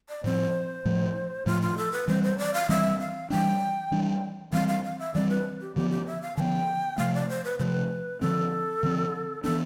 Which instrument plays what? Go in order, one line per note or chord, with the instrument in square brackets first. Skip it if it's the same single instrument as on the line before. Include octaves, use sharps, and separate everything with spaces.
[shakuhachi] D5
[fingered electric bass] A2 F3 C4 [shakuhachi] C5
[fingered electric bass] A2 F3 A3
[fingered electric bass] A2 F3 A3 [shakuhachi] F4
[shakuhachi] F4
A4
B4
[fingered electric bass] E3 G3 C4 [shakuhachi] C5
[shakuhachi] C5
D5
F5
[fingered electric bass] E3 G3 C4 [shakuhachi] E5
[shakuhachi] F5
[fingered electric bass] E3 G3 D4 [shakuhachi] G5
[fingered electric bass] E3 G3 D4
[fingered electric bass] E3 G3 C4 [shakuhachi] F5
[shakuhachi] F5
F5
E5
[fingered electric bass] E3 G3 C4 [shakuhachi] D5
[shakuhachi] B4
G4
[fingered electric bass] D3 F3 B3 [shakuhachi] G4
[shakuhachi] G4
E5
F5
[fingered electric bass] D3 F3 B3 [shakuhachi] G5 A5
[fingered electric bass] C3 F3 A3 [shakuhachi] F5
[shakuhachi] D5
C5
B4
[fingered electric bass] C3 F3 A3 [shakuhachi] B4 C5
[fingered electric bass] D3 F3 C4 [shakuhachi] A4
[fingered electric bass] D3 F3 C4
[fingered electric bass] E3 B3 D4 [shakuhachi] A4